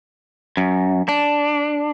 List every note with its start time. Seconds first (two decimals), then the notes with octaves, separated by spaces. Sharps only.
0.57 F#2
1.08 D4